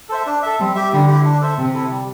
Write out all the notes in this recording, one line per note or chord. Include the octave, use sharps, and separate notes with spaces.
A4 C5 E5
D4
A4 E5
G3 C4
G4 E5
D3 G3
E4 G4
D4
A4 C5 E5
C3 C4
E4 A4
G3